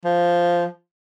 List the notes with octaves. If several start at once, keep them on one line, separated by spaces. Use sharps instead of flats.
F3